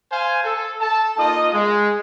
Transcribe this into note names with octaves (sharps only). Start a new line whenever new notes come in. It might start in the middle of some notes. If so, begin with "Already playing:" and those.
C5 F5 G#5
A4
A4 A5
A#3 D#4 F4 D#5 D#6
G#3